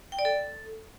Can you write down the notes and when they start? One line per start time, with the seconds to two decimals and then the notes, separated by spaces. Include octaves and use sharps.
0.12 G5
0.19 D5
0.25 A4